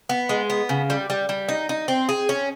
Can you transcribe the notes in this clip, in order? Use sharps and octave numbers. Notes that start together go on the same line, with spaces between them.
B3
G#3
B3
C#3
G3
G3
G3
D#4
D#4
C4
G#4
C#4